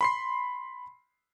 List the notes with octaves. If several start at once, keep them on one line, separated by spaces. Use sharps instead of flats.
B5 C6 C7